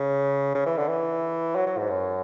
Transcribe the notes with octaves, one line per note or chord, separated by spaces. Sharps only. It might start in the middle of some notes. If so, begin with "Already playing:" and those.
Already playing: C#3
C#3
E3
D3
E3
F#3
F#3
G#2
F#2